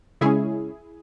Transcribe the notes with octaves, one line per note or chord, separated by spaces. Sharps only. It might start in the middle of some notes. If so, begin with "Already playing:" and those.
C#3 G#3 C#4 E4 G#4